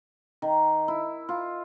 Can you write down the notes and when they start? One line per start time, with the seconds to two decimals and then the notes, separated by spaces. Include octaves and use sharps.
0.42 D#3
0.88 E4
1.29 F4